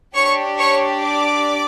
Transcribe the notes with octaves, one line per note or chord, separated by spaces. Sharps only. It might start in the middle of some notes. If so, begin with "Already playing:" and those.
D4 G4 C#5 C#6
C#5 C#6
D5 D6